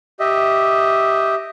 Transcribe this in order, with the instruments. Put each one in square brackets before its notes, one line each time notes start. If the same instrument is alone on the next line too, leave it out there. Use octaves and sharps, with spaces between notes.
[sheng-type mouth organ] G4 D#5 E5